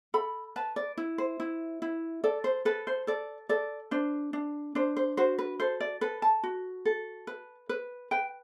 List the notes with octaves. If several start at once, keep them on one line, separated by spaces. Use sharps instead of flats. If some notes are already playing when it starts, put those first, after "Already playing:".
A4 B5
B4 A5
D5
E4
C5
E4
E4
A4 D5
C5
A4 B4
C5
A4 D5
A4 D5
D4 C5
D4
D4 C5
C5
F#4 C5
B4
A4 C5
D5
A4 B4
A5
F#4
A4
B4
B4
B4 G5